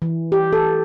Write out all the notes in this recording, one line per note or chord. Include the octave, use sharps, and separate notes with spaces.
E3
G4
A4